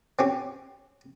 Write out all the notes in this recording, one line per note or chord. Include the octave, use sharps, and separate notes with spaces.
C4 C#4 G4